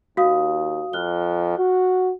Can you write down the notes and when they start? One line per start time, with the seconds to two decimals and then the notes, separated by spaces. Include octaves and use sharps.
0.17 D#2 F#4 F5 D#6
0.93 F2 F6 F#6 G7
1.58 F#4